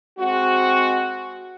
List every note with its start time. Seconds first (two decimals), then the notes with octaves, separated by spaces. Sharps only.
0.19 G#3 C4 F#4